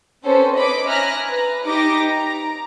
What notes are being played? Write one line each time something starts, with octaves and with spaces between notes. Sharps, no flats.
C4 C#4 A4 B4 C5
B4 C#5 D#5 B5 D6
E5 G#5 A#5 F6 F#6 A#6
B4 A#5
D#4 G4 D6 A#6
A#5